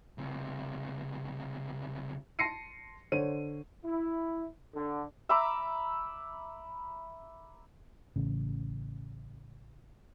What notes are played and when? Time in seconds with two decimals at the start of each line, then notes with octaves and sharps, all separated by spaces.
0.18 C#2 C3
2.39 A5 C6 A#6 C7 C#7 D#7
3.12 D3 C5 C#5 D#7
3.85 E4
4.75 D3
5.29 E5 A#5 B5 D6
8.16 A1 C#3